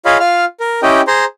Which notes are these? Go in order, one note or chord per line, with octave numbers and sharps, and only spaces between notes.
F4 G#4 C#5 D#5 F5 B5
F4 F5 F6
A#4
C#4 E4 G4 D#5 G5
G#4 C5 A#5 C6